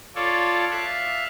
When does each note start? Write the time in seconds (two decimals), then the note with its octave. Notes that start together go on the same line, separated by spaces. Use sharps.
0.15 F4 A4 C#5 D5
0.71 E5 F5 F#6